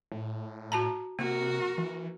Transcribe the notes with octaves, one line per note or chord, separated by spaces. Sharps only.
A2
F#4 A5 A#5
C3 A#3 F#4 A#4
E3